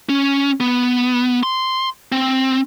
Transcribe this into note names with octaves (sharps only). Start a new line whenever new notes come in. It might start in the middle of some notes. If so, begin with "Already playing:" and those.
C#4
B3
C6
C4